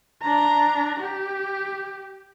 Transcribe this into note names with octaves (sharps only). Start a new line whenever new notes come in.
D4 A#5
G4